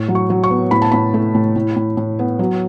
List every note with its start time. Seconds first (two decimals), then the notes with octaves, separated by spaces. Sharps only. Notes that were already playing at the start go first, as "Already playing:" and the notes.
Already playing: A2
0.08 F#3
0.15 C#6
0.30 F#3
0.44 C#6
0.51 B3
0.71 A2 B5
0.82 A5
0.92 A2 B5
1.14 A3
1.35 A2
1.56 A2
1.76 A2
1.97 A2
2.19 B3
2.39 F#3